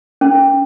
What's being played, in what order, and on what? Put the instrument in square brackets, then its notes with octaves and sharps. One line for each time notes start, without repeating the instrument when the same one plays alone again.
[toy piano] C#4